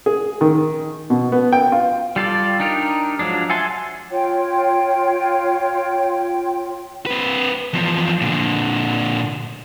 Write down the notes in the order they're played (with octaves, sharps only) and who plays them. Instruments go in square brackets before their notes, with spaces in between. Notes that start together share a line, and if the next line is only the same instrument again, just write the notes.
[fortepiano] G#4
D#3
B2
B3
G5
F4
[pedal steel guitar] G3 F4 A4 D5
D4 D#4 G4 A#4
F3 F#3 G#3 D4
E5 F#5 G#5 A5 C6
[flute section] F4 C#5 G5
[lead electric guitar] C4 B4
E2 F3
A#2 D3